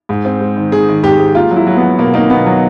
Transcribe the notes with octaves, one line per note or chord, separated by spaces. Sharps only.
G#2
C4
G#3
D#3
D#3 G#4
D#3
G#2 G4
G#3
A#3 F4
F#3
E4
F#3
B3
F#3
B2 A#3
A#3 D#4
B2 B3
F#3